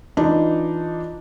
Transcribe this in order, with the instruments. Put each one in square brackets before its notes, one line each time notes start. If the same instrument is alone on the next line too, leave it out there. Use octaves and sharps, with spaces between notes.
[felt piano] E3 D4 D#4 F4